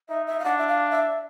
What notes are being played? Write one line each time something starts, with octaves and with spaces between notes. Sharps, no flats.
D#4 E5
E5
F5
D4 F#5
E5
F5
E5